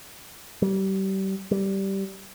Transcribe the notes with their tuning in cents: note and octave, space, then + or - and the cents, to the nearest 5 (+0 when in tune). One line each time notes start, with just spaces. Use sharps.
G3 -30
G3 -10